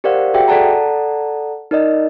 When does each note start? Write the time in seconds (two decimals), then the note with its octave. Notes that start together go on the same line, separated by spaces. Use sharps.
0.04 G4 A#4 C5 D5 F5 F#5
0.34 F#4 G#4 E5 G5
0.48 A4 D5 F#5 A5 A#5
1.71 D#4 A#4 D5 D#5